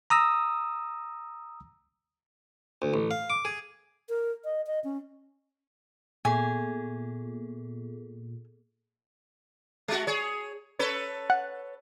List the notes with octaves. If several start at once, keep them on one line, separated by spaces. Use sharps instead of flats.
A#5 D#6 E6 A#6
D2
A1
F5
D6
G#4
A#4
D#5
D#5
C#4
A#2 B3 G#4 A4 G#5
G#3 F#4
G#4 C#5
A4 B4 C#5
F#5